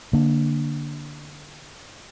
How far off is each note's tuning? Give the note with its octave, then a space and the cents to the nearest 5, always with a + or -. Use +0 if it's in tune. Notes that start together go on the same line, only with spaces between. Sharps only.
D3 +0 A#3 +0